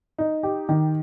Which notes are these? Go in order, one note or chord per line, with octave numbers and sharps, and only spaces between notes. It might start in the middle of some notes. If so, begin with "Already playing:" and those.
D#4
G4
D#3